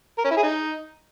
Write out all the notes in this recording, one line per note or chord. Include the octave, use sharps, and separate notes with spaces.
A#4
C#4
E4
G#4
D#4